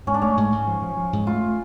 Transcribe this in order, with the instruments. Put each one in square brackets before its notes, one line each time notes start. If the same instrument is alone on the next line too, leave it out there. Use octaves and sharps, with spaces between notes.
[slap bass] G#2 [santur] C#4
[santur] D4
[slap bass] A3 [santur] C#4
[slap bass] G#2
G#2
F3
F3
F3
G#2
[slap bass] A3 [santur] F4